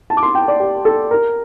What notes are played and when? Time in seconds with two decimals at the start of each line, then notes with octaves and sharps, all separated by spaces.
0.10 A5
0.17 D6
0.23 C6
0.35 G5
0.48 D5
0.60 G4
0.85 A4
1.11 A#4